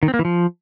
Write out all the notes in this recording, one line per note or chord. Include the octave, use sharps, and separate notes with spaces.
D#3
C4
A#3
E3
F3